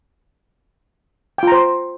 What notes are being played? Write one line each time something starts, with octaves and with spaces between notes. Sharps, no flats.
F4 C5 G5 A#5